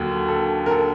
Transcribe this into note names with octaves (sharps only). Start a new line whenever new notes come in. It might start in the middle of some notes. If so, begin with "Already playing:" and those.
Already playing: D#2 D3 F#3
A4
A#4
A4